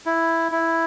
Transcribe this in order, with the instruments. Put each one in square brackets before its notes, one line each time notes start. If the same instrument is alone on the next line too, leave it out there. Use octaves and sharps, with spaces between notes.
[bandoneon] E4
E4